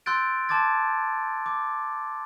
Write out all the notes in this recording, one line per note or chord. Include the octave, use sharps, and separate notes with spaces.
C6 E6 F#6 G6 A6 D7
A5 C6 D6 G#6 A6
D6